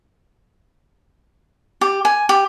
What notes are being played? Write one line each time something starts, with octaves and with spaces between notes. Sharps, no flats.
G4
G#5
G4